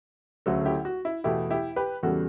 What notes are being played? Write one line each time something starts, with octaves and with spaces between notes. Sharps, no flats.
D2 C#3 F#3 A3 F#4 A4
E4 G4
F#4
E4
E2 B2 A3 E4 G4
E4 G4
G4 B4
E2 C#3 G3 F#4 A4